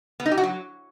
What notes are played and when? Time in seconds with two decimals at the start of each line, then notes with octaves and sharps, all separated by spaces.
0.20 B3
0.26 D#4
0.32 G4
0.38 F#4
0.43 F#3